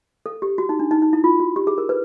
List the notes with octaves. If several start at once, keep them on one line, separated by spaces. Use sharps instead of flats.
A4
G4
F#4
D#4
D4
D#4
D#4
E4
F4
F#4
G4
G#4
A#4
B4